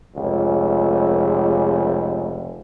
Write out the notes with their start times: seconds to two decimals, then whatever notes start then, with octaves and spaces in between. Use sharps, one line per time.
0.16 F1 C#2